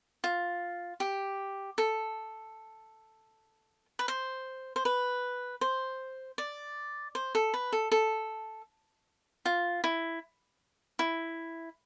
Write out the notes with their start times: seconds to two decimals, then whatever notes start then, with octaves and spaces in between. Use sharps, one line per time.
0.24 F4
1.00 G4
1.78 A4
3.99 B4
4.08 C5
4.76 C5
4.85 B4
5.61 C5
6.38 D5
7.15 C5
7.35 A4
7.54 B4
7.72 A4
7.92 A4
9.45 F4
9.84 E4
10.99 E4